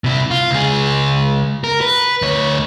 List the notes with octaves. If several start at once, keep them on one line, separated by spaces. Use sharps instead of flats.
C3 E4
F4
C#2 G#4
A#4
B4
D2 C#5